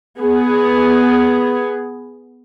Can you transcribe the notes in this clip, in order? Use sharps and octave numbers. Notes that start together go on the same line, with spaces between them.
B3 G#4